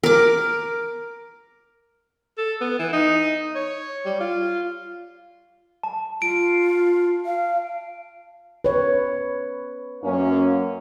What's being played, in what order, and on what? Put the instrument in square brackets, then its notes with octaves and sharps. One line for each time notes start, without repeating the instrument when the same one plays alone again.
[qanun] A#4 D6
[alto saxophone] A4
B3
E3
D#4
C#5
G3
F4
[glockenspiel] A5
[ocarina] F4 [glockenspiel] D7
[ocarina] F5
[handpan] B4 C#5
[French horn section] F#2 A#3 C#4